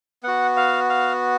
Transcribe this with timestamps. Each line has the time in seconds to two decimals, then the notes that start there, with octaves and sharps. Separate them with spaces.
0.23 B3 F#4 F#5
0.57 F5
0.89 F5